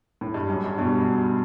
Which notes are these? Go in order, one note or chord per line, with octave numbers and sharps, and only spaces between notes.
A2
G2
F#2
G2
G2 B2